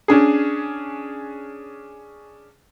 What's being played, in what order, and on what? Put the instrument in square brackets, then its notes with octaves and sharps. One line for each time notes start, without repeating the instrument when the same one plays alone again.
[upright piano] C#4 D4 G#4